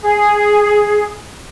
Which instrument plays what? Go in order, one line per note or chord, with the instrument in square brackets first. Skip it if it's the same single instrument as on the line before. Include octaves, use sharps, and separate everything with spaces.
[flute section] G#4